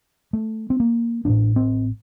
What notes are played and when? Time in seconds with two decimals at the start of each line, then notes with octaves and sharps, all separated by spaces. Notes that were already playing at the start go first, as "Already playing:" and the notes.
0.33 A3
0.70 C4
0.80 A#3
1.25 A1 A2 D4
1.56 C4